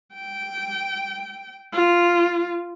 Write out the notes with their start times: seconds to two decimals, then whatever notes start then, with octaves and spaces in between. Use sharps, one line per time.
0.14 G5
1.72 F4